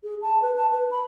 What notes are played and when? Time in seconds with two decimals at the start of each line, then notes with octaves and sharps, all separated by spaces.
0.04 G#4
0.22 A5
0.42 B4
0.56 A5
0.72 B4
0.91 B5